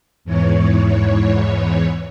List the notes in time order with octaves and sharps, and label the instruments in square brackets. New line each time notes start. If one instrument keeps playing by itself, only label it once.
[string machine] E2 G#2 E3 C#5